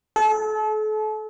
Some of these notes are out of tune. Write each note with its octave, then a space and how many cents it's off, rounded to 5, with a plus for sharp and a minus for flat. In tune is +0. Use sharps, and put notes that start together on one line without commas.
A4 -35